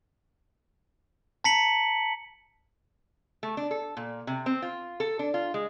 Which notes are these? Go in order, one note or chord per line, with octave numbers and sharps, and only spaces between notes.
A5 A#5 B6 C#7 F#7
A3
D4
A4
A#2
C3
C4
F4
A4
D4
F4
G#3